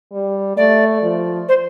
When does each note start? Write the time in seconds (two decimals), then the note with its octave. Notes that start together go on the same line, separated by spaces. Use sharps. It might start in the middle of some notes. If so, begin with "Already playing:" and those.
0.12 G3
0.57 A3 D5
1.02 F3
1.49 C5